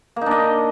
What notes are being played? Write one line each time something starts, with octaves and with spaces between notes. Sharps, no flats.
A#3 D4 D#4 D#5